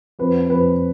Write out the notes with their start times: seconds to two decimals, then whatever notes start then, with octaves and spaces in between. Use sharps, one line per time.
0.19 F2 B4
0.50 F2 B4